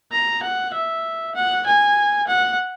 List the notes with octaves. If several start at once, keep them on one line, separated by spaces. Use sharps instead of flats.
A#5
F#5
E5
F#5
G#5
F#5